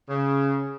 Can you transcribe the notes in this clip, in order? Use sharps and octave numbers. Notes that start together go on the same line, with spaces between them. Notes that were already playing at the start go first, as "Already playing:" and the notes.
C#3